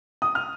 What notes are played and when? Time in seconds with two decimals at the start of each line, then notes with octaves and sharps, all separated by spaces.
0.22 D#6
0.35 F6